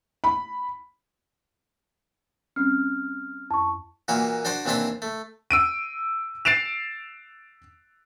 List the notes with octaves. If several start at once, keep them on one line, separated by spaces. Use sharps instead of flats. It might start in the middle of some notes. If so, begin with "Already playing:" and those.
B5
G3 C4 C#4 F6
F2 A5 C#6
A#2 E3 A#3 F#4
D4 F#4 C5 D5
D#2 E3 C4 D4 C5 B5
A3
E6 D7 D#7
A6 C7 D7 E7 F7